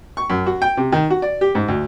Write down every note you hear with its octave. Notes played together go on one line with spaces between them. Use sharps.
C#6
F#2
F#4
G5
C3
D#3
F#4
D5
G4
G#2
D2